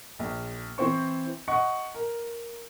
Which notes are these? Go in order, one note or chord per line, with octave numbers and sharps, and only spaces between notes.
A#1
E3 C4 C5 C#6
D#5 F#5 C#6
A#4